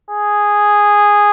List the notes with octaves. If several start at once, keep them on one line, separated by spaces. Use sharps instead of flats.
G#4